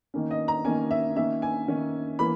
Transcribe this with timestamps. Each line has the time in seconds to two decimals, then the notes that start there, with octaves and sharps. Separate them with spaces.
0.14 D#3 A#3 C#4
0.31 D#5
0.48 A#5
0.65 D#3 A#3 C#4 G#5
0.91 E5
1.16 D#3 A#3 C#4 E5
1.42 G#5
1.68 D#3 A#3 C#4
2.19 E3 A#3 B5